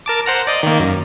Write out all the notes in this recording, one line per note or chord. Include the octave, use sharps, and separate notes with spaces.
A#4 A5 D6
C5 F#5 A#5
D5 D#5
D#3 A#3
F#2